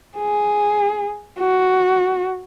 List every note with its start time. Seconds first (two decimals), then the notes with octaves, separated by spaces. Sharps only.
0.18 G#4
1.39 F#4